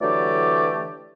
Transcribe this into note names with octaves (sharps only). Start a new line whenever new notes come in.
D3 E3 F#3 A3 G4 D5